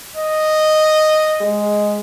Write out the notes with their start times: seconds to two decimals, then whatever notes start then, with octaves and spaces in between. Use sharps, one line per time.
0.17 D#5
1.41 G#3